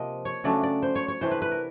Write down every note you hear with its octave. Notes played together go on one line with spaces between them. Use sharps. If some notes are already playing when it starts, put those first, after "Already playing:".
Already playing: C3 F3 A#3 D#5
C#5
C#3 F#3 A3 D4 D5
D5
C5
C#5
C#5
C3 E3 A3 D4 C5
B4
B4
A#4